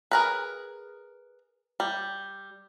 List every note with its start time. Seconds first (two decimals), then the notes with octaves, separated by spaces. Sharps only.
0.11 G#4 A#4 B4
1.80 G3